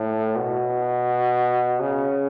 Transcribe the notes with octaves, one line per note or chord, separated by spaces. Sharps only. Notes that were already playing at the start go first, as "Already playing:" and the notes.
Already playing: A2
B2
C#3